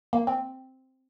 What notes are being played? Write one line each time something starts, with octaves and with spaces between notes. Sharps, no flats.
A#3
C4